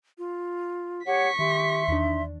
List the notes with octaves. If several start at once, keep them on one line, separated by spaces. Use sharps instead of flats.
F4
G4 C#5 F#5 C#6 B6
D#3 G4 E5 C6
E2 D4 D#4